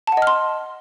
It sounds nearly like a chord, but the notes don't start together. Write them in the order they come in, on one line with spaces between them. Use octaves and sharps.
A5 F#5 D#5 F6 C6